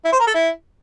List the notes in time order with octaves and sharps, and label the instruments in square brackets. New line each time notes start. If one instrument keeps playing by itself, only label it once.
[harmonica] E4
C5
A#4
A4
E4